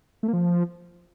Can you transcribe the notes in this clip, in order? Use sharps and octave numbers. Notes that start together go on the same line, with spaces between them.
A3
A#3
F3